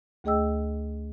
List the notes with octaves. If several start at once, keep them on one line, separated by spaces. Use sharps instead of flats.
D2 A3 G#4 D#5 G5 E6